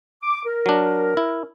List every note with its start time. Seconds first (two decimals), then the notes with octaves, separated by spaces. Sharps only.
0.23 D6
0.45 A#4
0.66 F#3 D4
1.17 E4